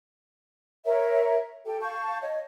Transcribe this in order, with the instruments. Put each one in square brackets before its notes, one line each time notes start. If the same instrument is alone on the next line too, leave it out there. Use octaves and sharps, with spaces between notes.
[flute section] A#4 C#5 E5
G4 A4 G5
F5 A5 C#6 G6
C#5 D#5